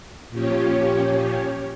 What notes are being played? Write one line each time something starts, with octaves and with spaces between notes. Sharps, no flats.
A#2 F3 C#4 G4 C#5